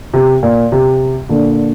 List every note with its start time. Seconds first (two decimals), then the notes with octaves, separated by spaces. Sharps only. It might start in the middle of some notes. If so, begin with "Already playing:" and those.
0.14 C3
0.43 A#2
0.72 C3
1.29 A#2 D3